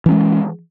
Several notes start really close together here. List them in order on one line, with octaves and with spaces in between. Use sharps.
E3 C#4 G#3